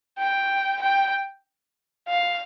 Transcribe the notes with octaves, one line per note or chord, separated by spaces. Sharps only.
G5
G5
F5